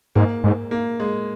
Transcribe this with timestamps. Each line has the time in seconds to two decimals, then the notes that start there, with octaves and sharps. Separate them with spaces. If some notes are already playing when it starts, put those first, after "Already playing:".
0.15 G#2 A#3
0.44 G#2
0.71 A#3
1.00 G#3